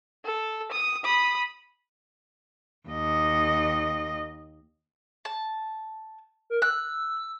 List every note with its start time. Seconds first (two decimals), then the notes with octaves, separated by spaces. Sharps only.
0.25 A4
0.72 D#6
1.05 B5 D#6
2.88 D#2 D#5
5.25 A5
6.50 A#4
6.62 E6 F#6